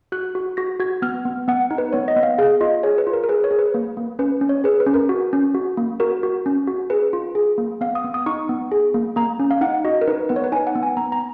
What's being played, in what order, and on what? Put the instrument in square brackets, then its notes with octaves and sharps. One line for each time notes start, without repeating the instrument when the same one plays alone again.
[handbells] F#4 F#6
F#4
F#4 A#6
F#4 G#6
B3 F6
B3
B3 F#5
D#4
B4
B3 C#5
D#5
B3
F5
G#4 F5
F4 D#5
G#4 C#5
B4
F4
A#4
A#4
G#4 B4
C#5
G#4
B4
A#3
A#3
C#4 B4
C#4
C#5
G#4 B4
B4
C#4
A#4
F#4
C#4
F#4
A#3
F#4 A#4
F#4
C#4
F#4
G#4 B4
F4
G#4
A#3
B3 F5
D#6
B3
D#6
D#4 C#6
B3
G#4
A#3
A#3 A#5
C#4
F5
D#4 F#5
F#4 D#5
A#4
D#4 B4
B3 B4
C#5
B4
D#4 G#5
F#5
B3
G#5
B3 A#5
A#5